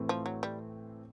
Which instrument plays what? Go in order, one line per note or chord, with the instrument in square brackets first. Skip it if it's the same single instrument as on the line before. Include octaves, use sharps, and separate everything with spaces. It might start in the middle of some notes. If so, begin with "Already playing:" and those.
Already playing: [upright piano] A2 E3 A3 C4
[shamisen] F3
F#3
G3